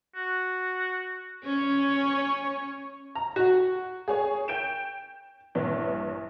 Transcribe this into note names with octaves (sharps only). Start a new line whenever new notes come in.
F#4
C#4 C#5
A#5
F#4
G#4 C#5 G#5
G5 G6 D7 E7
A#1 G2 E3 C#5